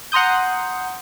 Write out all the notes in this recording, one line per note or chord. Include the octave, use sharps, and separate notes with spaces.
F#5 A#5 C6 D#6 G6